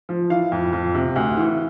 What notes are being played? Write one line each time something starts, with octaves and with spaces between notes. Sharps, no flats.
F3
E3 F5
F2
F2
C3
D2
E3